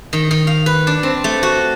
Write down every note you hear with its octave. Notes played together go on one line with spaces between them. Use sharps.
D#3
D#3
F5
B4
D4
C4
A3
F#4